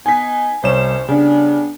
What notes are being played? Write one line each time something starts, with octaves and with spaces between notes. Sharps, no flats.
B3 D#4 G#5 B6
C2 D#3 C#4 C5 C#5 E7
C#3 G3 B3 D4